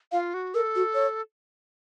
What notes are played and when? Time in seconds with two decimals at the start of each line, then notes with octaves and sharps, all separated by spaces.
0.12 F4 F5
0.34 F#4
0.54 A4 A#4
0.76 F#4
0.94 C#5